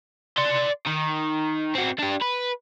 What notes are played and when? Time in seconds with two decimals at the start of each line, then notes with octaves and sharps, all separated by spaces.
0.37 D5 C6
0.86 D#3
1.75 C4 F#4
1.99 D4 G4
2.21 B4